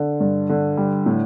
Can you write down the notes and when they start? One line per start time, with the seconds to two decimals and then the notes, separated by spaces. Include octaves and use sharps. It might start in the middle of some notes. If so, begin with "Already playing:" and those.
Already playing: D3
0.20 G2
0.49 D3
0.77 G3
1.06 A2